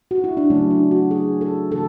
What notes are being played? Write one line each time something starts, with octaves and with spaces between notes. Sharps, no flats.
F#4
E4
D4
C#3 F#3 A3 C#4
D4
F#4
G#4
A4
C#3 E3 A3 A4